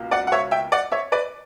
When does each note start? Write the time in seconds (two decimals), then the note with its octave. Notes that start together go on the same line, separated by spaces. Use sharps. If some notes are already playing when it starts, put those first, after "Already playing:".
Already playing: C#2 B2 A#3
0.11 D5 F#5
0.27 F#5
0.32 C#5 E5
0.51 E5 G5
0.72 D5 F#5
0.92 C#5 E5
1.12 B4 D5